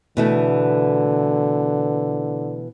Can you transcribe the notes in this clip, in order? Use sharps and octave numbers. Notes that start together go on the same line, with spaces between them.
B2 D3 E3 A3